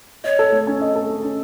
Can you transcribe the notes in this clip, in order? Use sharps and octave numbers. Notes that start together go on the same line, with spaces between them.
C#5 D#5
A4
A3
C#4
D#5
A4
A3
C#4